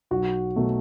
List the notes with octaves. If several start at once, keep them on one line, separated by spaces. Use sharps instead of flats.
B1 F#4
B2 F#3 A3